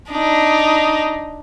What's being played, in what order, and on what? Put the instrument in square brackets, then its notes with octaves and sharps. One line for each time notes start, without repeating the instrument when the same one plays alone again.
[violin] D4 D#4